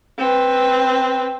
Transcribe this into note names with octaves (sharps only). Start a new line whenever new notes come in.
C4 B4